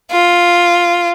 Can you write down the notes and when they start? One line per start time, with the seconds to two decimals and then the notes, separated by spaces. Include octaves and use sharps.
0.11 F4